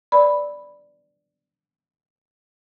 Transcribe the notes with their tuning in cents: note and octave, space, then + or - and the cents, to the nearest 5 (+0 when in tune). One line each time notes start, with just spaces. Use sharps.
B4 +30 D5 +0 B5 +0